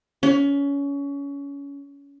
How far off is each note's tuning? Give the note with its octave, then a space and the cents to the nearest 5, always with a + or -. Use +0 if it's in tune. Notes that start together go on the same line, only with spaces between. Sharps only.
C#4 +25